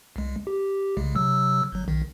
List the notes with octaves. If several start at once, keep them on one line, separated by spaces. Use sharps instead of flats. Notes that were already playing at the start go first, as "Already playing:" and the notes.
C2 G#3
G4
C2 C#3 G#3
C3 F#3 E6
G1 F#3
B1 D#3